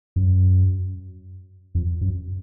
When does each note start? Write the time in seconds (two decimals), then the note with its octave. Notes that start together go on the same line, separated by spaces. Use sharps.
0.16 F#2
1.75 F2
2.01 F#2